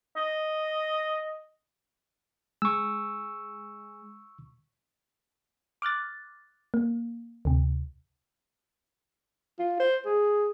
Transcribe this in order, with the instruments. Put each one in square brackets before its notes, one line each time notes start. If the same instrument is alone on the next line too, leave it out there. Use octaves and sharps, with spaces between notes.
[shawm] D#5
[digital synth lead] G#3 [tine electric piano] C#6 E6
[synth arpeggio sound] D6 F6 F#6 A6
A#3
D2 C3
[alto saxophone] F4
C5
G#4